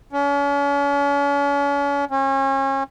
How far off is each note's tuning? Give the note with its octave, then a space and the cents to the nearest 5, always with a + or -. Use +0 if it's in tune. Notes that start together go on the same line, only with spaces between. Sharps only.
C#4 +40
C#4 -35